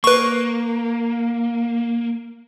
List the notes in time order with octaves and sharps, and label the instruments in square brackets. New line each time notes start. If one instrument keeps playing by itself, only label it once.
[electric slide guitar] A#3 [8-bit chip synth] B4 C#6